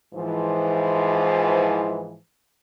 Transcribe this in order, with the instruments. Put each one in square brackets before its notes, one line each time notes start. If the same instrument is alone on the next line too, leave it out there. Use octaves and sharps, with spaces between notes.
[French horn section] G#2 E3 F3